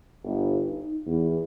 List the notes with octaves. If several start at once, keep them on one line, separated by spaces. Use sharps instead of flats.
G1
D#4
E2